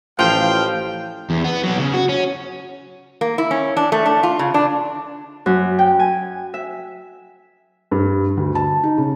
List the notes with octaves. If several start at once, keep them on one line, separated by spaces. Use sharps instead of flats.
A1 F3 F4 F5 G5
E2
B3
F#3 B3
C#3
F#4
C#4
A#3
E4
C#4
D4
A3
D4
F4
C#3
D4
F#2
G5
G#5
E5
G2
D2
A5
D#4
C#3